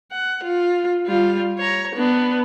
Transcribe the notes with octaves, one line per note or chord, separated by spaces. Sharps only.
F#5
F4
G3 F4
C#5 A#5
B3 D4